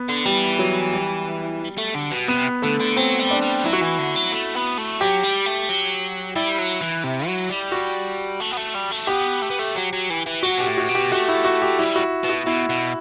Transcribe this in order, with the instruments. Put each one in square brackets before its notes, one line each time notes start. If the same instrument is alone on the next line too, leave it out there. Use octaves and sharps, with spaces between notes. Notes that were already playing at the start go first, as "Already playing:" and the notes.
Already playing: [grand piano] B3
[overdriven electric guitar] D3
[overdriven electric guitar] E3 [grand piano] G3
[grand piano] F#3
G3
[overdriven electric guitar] A3
D3
B2
[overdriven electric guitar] C3 [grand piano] B3
[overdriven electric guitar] D3 [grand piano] A3
[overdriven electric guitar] D3
[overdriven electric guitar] F#3 [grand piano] C4
[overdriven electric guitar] G3
[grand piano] D4
[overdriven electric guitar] G3
[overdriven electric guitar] F#3 [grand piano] E4
[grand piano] F#4
[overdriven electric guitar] E3 [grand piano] E4
[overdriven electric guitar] D3
F#3
A3
B3
A3
[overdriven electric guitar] F#3 [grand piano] G4
[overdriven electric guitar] G3
A3
F#3
[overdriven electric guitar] G3 [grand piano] E4
[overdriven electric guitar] F#3
E3
C3
F#3
G3
[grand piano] F#4
[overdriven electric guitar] A3
B3
A3
G3
A3
[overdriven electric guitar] B3 [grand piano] G4
[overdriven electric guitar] A3
B3
A3
F#3
F#3
E3
E3
[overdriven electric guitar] F#3 [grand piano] F#4
[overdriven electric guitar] B2 [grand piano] G4
[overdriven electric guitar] A2
[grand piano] F#4
[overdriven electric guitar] B2
[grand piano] G4
[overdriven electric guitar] A3 [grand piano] F#4
[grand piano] E4
F#4
G4
[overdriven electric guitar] G3 [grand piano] E4
[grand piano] F#4
[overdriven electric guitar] B2
[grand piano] F#4
[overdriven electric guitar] B2 [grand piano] E4
[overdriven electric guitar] B2